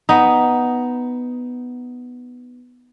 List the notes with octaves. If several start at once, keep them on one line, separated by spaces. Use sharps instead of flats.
B3 D#4